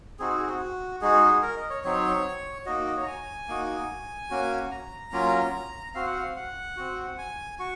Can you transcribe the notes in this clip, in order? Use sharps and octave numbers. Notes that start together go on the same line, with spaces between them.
C4 D#4 F#4 G#4
G#4
F#4
G#3 D#4 F#4 G#4
A#4
D#5
C#5
F#3 C4 D#4 C#5
A#3 D#4 F#4 D#5
D#5
C#5
A#5
G#5
A#3 D#4 F#4
A#3 C#4 F#4
A#5
F#3 A#3 C#4 F4
C4 F#4 F5
F#5
F5
F#5
C4 F#4
G#5
F#4 C#6